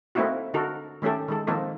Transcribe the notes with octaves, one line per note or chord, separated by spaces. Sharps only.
A3 A#3 C4 D#4 E4 F#4
D3 D#4 F#4 A4 A#4
D#3 A3 C#4 G4 A4
D#3 G#3 A4
D#3 F3 A#3 C4 D#4 A4